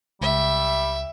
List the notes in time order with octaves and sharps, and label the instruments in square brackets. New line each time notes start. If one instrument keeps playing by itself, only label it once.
[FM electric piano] C#2 [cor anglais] G3 [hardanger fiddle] E5